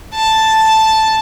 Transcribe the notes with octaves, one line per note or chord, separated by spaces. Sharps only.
A5